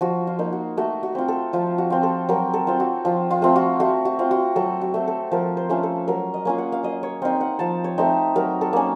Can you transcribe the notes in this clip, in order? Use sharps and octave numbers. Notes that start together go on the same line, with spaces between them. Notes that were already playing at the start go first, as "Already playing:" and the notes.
F3 F#4
F4
A#3 D#4
F#4
A3 F#4
F#4
C4 F4
A4
F3 F4
F#4
C4 F4
A4
F#3 A#4
A4
C4 F4
F#4
F3 F4
F4
A3 C4 F4
F#4
A3 F#4
F#4
C4 F4
F#4
F#3 A4
F#4
A3 C4
A4
F3 A#4
C5
A3 C#4 F4
A4
F#3 A#4
D#5
A#3 C#4 F4
F#5
F5
F#3 D#5
C#5
C4 D#4 F5
F#5
F3 A5
C#5
A3 C4 D#4
F#3 A#4
A4
A#3 C#4